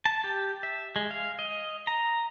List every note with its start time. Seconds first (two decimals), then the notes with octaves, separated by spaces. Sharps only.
0.06 A5
0.24 G4
0.63 E5
0.96 G#3
1.11 F5
1.39 D#5
1.87 A#5